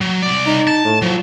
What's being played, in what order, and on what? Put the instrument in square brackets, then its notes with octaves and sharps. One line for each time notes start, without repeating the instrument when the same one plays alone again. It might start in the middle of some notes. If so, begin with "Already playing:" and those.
[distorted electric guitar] F#3
C2 D5
[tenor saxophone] D#4
[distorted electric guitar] A5
[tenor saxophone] A2
[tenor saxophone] F3 [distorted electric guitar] F#3